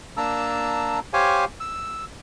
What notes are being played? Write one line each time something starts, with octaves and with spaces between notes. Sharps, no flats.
A#3 D4 A5 A#5 E6
G4 C5 C#5 F5 G#5
E6